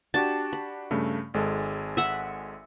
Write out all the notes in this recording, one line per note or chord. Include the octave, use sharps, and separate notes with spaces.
D4 F#4 G4 A5
B5
G2 C#3 A3
G#1 G#3 A4
E5 F#5